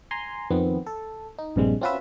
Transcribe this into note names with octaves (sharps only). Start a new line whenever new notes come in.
G#5 A#5 C6
F2 D#3 B3 C4
A4
D#4
A#1 G2 C3 G3 G#3
C4 C#4 F4 F#4 B4 E5